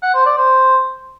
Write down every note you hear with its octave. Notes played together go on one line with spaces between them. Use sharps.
F#5
C5
D5
C5